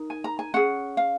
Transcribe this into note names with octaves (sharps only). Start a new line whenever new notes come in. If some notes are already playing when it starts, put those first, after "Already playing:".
Already playing: D#4 A#4
G#5
A#5
G#5
C#4 G#4 F#5
F5